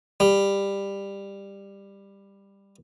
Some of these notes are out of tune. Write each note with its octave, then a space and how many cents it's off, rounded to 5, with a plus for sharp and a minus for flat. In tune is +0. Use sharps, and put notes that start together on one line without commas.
G3 +15